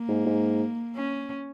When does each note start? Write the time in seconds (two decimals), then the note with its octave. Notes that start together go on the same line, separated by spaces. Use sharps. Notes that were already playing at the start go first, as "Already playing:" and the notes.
Already playing: A#3
0.08 G#2
0.26 G#2
0.96 C#4